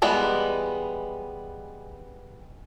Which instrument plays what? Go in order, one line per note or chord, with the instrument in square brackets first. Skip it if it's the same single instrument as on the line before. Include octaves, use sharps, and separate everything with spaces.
[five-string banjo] E3 G3 G#3 B3